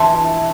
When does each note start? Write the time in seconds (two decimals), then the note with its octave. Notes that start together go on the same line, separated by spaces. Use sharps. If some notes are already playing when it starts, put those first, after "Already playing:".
Already playing: E3 E4 A5 C6
0.14 E4